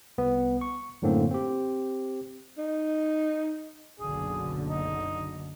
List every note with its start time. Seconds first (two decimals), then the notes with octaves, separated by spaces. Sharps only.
0.18 C2 B3
0.61 C#6
1.02 F#2 A2 D3 A#3 C4
1.31 C4 G4
2.58 D#4
4.00 F#1 B1 D3 G#4
4.69 D#4